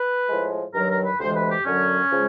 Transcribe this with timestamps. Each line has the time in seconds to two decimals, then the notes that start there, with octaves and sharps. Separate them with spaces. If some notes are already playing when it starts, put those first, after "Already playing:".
Already playing: B4
0.28 A2 F3 G#3
0.73 G2 D#3 F#3 A#4
0.89 A#4
1.04 B4
1.19 D2 C3 E3 G#3 C5
1.35 B4
1.49 G4
1.64 F#2 D3 F#3 C#4
2.11 C#3 F3 G#3